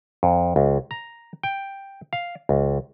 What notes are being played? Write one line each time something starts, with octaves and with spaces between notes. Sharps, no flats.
F2
C#2
A#5
G5
F5
C#2